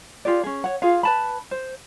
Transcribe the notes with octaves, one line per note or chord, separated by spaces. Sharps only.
F4 G4 G#4 D5
C#4 G#4
C#5 F#5
F4 G#4 F5
B4 A5 B5
C5